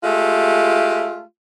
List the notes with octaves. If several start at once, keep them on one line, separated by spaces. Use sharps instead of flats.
G#3 A3 F4 G4